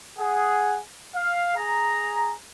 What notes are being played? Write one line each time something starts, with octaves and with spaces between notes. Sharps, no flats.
G#4 F#5
F5
G#4 A#5